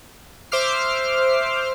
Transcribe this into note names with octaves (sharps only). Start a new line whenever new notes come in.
C5 E5 D6 F6 C7